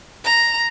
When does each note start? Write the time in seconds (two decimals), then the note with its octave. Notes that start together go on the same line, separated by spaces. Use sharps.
0.25 A#5